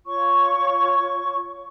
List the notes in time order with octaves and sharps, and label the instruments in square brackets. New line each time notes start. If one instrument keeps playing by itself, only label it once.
[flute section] F4 C#5 C#6